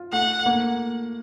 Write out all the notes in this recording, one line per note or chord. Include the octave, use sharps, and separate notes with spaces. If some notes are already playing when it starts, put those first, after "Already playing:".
Already playing: F4
A3 F#5
A#3